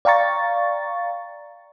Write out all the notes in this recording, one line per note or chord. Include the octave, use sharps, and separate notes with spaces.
D5 F5 G5 A#5 C#6 A6